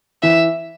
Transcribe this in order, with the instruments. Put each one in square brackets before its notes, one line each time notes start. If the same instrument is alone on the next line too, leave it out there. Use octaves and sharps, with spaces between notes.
[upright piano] E3 [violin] E5